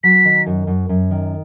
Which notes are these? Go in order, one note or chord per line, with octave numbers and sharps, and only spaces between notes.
F#3 B6
D#3
F#2
F#2
F#2
D#3